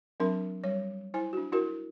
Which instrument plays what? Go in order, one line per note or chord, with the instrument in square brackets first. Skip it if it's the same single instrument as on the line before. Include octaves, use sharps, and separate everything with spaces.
[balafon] F#3 C4 D4 A#4 C6
G3 C#5
E4 C5 G#5
D4 F#4
E4 F#4 A#4